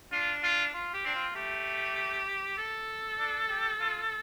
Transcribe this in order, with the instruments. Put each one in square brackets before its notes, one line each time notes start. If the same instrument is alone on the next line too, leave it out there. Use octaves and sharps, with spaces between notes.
[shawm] D4 [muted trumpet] F4
[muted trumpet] F4
[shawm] F4
G4
[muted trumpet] C4 [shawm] D4
[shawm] F4
[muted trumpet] A3 [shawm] G4
[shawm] A4
[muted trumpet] D4
G4
F4